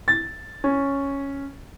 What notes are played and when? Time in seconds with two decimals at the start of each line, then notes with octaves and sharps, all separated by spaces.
0.08 A6
0.64 C#4